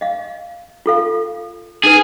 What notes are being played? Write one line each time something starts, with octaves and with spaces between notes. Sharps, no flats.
D#5 F5
F4 A4 F5
D#4 E4 G#4 B4